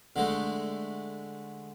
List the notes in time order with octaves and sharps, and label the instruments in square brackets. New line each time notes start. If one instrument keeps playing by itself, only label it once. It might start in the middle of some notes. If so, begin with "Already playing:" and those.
[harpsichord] D3 G#3 A3